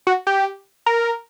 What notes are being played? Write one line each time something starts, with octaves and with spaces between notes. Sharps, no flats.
F#4
G4
A#4